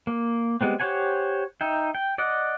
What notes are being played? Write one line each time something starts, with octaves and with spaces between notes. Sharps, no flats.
A#3
G3 G#3 B3 C4
G4 C5 C#5 F#5 G#5
D#4 E5 G5
G5
D5 D#5 F#5